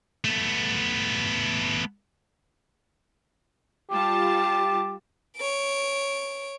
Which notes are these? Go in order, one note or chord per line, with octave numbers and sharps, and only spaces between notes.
A3 B3
G3 F4 G4 A5
C#5 D7